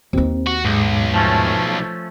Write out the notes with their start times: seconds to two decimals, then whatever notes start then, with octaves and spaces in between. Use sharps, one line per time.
0.13 D#2 C4 D#4
0.47 F#4
0.65 B1 G#2 G#3
1.14 F3 A3 C#4